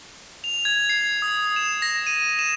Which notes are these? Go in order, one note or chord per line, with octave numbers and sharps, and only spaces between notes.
F7
G#6
C7
D#6
E7
A#6
D#7
E7